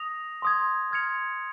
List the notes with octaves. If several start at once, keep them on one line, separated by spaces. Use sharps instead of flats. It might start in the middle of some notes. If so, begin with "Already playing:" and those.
Already playing: D#6 A#6 F7
C6 D#6 G#6
C6 F6 G#6 C#7 F7